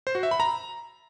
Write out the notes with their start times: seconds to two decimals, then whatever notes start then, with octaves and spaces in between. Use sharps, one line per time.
0.07 C5
0.15 F#4
0.23 E5
0.31 B5
0.40 A#5